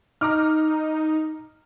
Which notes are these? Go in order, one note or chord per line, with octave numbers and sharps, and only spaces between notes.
D#4 A#5 D6 F6